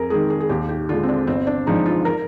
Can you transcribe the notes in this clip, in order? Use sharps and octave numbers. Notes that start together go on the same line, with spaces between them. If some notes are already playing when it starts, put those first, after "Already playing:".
Already playing: F2 G#4 A#4
D#3 G#3 G#4
G#4
G#4
D#2 G4
G4
D3 G#3 F4
C4
D4
G1 C4
D4
G2 F3 G#3 D#4
F4
A#4